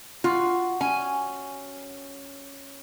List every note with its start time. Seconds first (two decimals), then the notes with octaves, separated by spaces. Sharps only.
0.24 F4 F#4
0.81 C#4 G#5